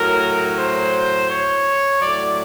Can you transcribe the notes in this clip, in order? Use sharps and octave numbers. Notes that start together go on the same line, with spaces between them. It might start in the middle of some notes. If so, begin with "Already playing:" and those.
Already playing: A2 F#3 A#4
C5
C#5
A2 F#3 D5